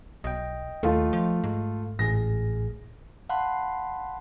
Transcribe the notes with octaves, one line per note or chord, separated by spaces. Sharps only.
B1 D#5 G5
D#2 A3 F4
F3
G#2
A1 A2 G#4 A#6
F5 F#5 A5 B5 C6 F#6